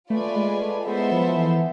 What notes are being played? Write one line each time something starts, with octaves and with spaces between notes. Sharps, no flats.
A3 F4 B4 D5 G#5
G#3
A3
G#3 B3 E4 A4 C5 E5
F3
E3